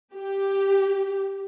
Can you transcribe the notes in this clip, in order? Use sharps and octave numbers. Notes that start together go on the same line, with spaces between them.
G4